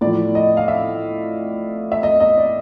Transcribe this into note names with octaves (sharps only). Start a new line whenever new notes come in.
A2 F3 D5
D#5
F5
E5
E5
D#5
D#5
D5